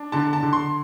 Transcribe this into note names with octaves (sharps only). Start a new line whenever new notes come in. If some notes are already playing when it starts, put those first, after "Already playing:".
Already playing: D4
D3 A5
A5
D3
C6